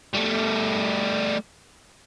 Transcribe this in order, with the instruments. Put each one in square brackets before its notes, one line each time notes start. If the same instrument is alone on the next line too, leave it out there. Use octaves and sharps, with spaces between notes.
[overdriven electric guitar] G3 A3